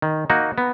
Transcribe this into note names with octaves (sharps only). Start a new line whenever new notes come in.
D#3
A#3 D#4 F#4
B3